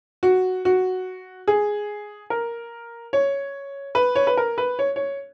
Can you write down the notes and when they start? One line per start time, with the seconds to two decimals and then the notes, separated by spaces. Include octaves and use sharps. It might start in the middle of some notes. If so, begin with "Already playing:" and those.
0.23 F#4
0.65 F#4
1.48 G#4
2.30 A#4
3.13 C#5
3.95 B4
4.15 C#5
4.27 B4
4.37 A#4
4.58 B4
4.79 C#5
4.96 C#5